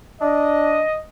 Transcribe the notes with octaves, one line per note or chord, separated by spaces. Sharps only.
D4 D#5